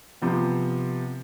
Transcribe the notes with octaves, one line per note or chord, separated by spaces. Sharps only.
C3 F3 B3